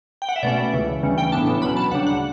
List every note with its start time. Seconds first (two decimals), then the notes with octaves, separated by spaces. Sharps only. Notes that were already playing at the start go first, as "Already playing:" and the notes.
0.22 G5
0.29 F#5
0.36 E5
0.43 B2 A3 C#4 D5
0.73 C#2 C#3 E3
1.03 D2 C#3 E3 G3 C#4
1.18 G5
1.32 A2 E3 B3 D4 A5
1.62 B2 F#3 C#4 B5
1.77 A5
1.91 D2 C#3 G3 D4 F#5
2.07 F#5